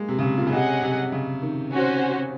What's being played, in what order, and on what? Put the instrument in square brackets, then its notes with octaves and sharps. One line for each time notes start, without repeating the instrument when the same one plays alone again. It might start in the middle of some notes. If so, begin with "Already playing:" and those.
Already playing: [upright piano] G#3 A#3
C3
C#3
C3
A#2
C#3
[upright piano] C3 [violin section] C#4 G#4 D#5 F#5
[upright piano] C3
C#3
D#3
[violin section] C#4 F#4 C5